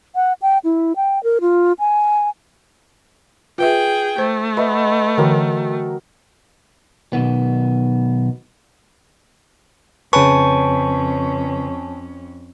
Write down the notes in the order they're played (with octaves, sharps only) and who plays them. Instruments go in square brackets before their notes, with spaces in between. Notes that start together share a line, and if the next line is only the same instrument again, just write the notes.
[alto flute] F#5
G5
E4
G5
A#4
F4
G#5
[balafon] F4 B4 E5 [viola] G#4 G5
[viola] A3 [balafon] C5
[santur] B4 D#5 F#5 [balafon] E5
[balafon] D3 E3 [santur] F#3 A#4 G5
[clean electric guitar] B1 B2 D#3 B3
[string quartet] F2 C#4 [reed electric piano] C#3 B4 [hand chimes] C#5 G#5 A5 [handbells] C#6